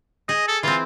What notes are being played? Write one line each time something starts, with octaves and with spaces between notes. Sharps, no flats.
G#4 D#5
A4
E3 C4 F4